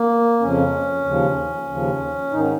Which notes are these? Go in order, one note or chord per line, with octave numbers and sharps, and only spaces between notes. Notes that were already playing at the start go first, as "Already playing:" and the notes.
Already playing: A#3
F2 C#3 F3 C#4
D#2 C#3 F3
D#2 C#3 F3
G#2 D#3 D#4
C#4